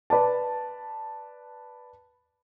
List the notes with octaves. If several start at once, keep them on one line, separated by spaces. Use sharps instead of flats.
B4 D5 A5